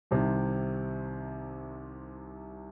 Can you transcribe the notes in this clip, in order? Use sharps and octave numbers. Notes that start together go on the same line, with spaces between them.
C2 C3 D#3